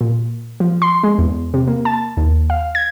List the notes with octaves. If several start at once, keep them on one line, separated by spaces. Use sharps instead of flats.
A#2
F3
C6
G#3
E2
C3
A#3
A5
D#2
F5
G#6